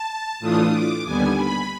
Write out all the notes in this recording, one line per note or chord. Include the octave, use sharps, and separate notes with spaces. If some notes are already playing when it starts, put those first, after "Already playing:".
Already playing: A5
A2 E3 A3 D4 F4 D#6
D6
D#2 D3 G3 B3 G#5
B5